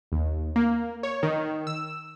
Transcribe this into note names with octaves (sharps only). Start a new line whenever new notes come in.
D#2
A#3
C#5
D#3
E6